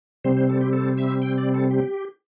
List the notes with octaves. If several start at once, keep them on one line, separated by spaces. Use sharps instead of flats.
C3 G3 C4 C5
C5
A4
G4
A4
E5
G5
D5
A4
G4